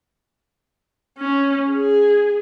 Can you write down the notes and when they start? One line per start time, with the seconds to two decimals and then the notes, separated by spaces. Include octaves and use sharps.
1.18 C#4
1.71 G#4